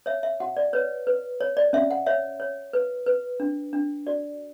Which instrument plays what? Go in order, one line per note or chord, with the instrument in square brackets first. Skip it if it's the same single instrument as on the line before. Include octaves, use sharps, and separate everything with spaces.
[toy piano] C#5 E5
E5
F#4 F#5
D5
B4 C#5
B4
C#5
D5
C#4 E5
F#5
C#5 E5
C#5
B4
B4
D4
D4
F#4 D5